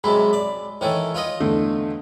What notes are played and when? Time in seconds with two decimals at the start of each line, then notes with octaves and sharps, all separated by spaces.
0.04 F#2 C3 G#3 B5
0.33 D5
0.81 D#3 E3 A3 C#5
1.14 F4 B4 D#5
1.40 E2 D3 A3